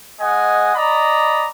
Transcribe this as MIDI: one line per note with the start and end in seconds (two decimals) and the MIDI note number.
0.20 0.73 56
0.20 0.73 75
0.20 0.73 78
0.20 0.73 80
0.75 1.46 74
0.75 1.46 75
0.75 1.46 82
0.75 1.46 83